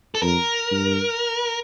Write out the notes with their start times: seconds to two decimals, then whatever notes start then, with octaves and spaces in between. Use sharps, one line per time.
0.15 A4
0.22 F2 A#4
0.71 G2